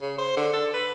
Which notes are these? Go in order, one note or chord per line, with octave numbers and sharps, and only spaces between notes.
C#3
C5
D3
A4
B4